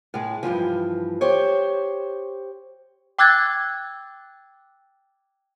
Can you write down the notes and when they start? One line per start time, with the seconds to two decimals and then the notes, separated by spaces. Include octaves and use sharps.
0.14 A2 G#3
0.43 G2 A#2 E3 F3
1.21 G4 C5 C#5
3.19 G5 D6 E6 F#6 G#6 A6